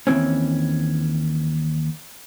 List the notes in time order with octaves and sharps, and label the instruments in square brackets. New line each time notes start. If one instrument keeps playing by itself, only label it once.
[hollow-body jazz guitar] D#2 G#2 E3 C4 C#4